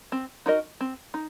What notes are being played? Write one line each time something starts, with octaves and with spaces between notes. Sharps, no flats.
C4
D#4 F#4 A#4 D#5
C4
D#4